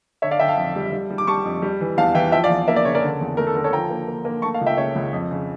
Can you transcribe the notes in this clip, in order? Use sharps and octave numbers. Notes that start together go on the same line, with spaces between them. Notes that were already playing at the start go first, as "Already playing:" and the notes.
D3 C#5 E5
D5 F5
D3 E5 G5
F5 A5
F2
G3
G3
G3
D6
G3 A5 C#6
F2
G3
E3
E2 F5 A5
E3 E5 G5
F3 E5 G5
D5 F5
E2
A#3 E5
D5
C#3 C#5
A#4 D5
D3
E2
A3 A#4
A4
D3 A#4
A4 C#5
F3 G5 A#5
A#3
A#3
A#3
A3 A5 C#6
F5 A5
C#2
E5 G5
C#3 C#5 E5
C#2
F2
C#3